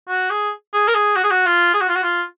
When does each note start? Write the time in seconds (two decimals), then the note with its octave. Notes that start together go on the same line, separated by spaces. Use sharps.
0.09 F#4
0.30 G#4
0.74 G#4
0.88 A#4
0.95 G#4
1.16 F#4
1.24 G#4
1.31 F#4
1.46 F4
1.74 G#4
1.81 F#4
1.89 F4
1.96 F#4
2.03 F4